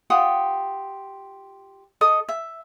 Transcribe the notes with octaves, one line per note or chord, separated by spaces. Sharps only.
F4 G4 F#5 D#6
A4 D#5 D#6
E5